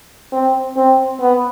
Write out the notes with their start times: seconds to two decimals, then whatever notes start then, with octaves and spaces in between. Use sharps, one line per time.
0.33 C4
0.77 C4
1.20 B3